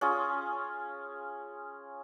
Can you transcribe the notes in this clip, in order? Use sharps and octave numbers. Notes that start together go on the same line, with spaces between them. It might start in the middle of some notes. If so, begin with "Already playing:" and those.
C#4 F4 G#4